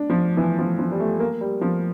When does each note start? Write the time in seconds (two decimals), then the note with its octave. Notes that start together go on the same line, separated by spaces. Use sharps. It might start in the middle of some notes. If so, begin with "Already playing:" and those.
Already playing: D4
0.10 F3
0.37 E3
0.59 F3
0.79 F3
0.92 G3
1.00 A3
1.20 A#3
1.41 G3
1.61 F3